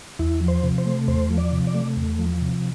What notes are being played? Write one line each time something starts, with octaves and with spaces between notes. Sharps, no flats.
E2 E4
F3
C5
C3
C5
A3
E2 C5
F3
D5
C3
D5
A3
E2
F3
C3